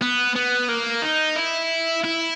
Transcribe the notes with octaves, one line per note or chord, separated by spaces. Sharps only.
B3
B3
A#3
D#4
E4
E4